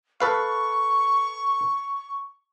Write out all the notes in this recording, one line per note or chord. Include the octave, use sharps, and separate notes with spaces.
A4 B4 F5 C#6